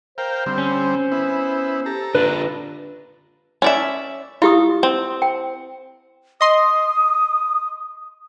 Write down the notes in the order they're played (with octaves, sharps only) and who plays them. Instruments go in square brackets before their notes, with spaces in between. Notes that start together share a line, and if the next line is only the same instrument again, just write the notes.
[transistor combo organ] A#4 F5 G5 [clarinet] C5
[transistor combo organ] D3 G3 C4
[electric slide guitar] C#4
[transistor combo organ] B3 E4
[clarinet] G4 [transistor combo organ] A4 A#5
[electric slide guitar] D3 D4 F4 [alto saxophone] B4
[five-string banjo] C#4 D5 E5
[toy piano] E4 G4 D#6 [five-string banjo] F4
[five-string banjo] C4
[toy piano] G5
[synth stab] D#5 C6 [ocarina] D#6